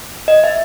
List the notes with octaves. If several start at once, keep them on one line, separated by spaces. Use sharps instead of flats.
D#5
E5